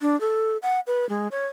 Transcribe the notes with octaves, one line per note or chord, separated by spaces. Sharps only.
D4
A4
F#5
B4
G#3
C#5